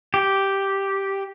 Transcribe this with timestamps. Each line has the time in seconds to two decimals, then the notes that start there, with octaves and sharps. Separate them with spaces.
0.14 G4